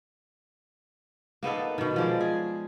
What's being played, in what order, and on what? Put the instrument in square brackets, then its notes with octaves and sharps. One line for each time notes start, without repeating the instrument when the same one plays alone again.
[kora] A#3 B3 D#4 A4
B2 D#3
F3 G#3 D5
G#4